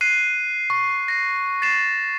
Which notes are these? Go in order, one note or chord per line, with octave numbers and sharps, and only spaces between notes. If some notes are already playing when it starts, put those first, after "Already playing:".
F#6 C7 D#7
C#6
A#6 C7
A6 C7 E7